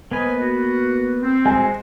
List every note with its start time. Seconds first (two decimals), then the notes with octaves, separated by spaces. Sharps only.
0.11 A#3 B3 B4 C5 D#5 G#5
0.40 F#4
1.22 C4
1.46 G#3 F#4 C5 G#5